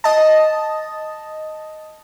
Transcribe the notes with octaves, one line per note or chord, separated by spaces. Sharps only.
D#5 A5